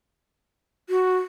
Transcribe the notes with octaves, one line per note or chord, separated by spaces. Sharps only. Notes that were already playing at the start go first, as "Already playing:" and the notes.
F#4